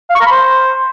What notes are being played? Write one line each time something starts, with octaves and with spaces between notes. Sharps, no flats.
F5
C#6
A#4
B5
C5